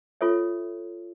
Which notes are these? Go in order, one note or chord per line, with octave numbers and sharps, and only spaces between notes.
F4 A4 C#5 E5